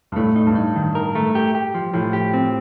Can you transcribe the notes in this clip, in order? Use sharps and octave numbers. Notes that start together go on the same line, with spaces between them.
G2
A2 A3
D#4
G2
D#4
D#3
A#4
A3
G4
G4
F3
A2 F3
G4
C4